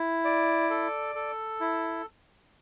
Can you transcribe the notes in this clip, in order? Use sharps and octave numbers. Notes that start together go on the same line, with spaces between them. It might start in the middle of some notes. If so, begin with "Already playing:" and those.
Already playing: E4
D5
A4
A4
E4